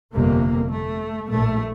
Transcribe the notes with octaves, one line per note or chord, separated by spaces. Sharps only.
G1 F2 C3 A#3
A3
A#1 A2 A3